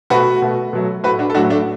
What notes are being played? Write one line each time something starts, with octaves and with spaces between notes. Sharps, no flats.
B2 A3 F#4 B4
B2 A3
B2 F#3 A3
A2 A3 F#4 B4
D4 F#4
A4
A2 F#3 A3 D4 F#4
A3 D4